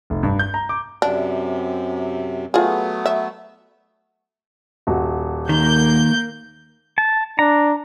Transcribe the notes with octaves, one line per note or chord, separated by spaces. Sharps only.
F1
G2
G6
A#5
D6
F#2 C3 D4
F#3 A3 B3 F4 G#4
E5
D#1 F#4
D#3 A#3 G6
A5
D4 A#5